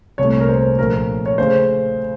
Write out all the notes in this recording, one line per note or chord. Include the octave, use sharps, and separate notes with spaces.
C2 A#2 A3 C#5
A#4
C5
A#1 A#2 F3 A3 A#4
C#5
C#3 A3 C5